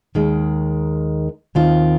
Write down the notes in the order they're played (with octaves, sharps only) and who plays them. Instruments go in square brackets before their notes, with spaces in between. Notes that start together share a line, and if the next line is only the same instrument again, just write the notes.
[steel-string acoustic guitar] D#2 D#3 G#3
D#2 D#3 C4 F4